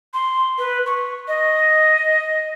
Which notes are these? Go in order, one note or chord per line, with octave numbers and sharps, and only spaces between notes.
C6
B4
C#6
D#5